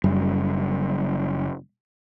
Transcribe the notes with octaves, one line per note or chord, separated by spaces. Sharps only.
F#1 F#2 G3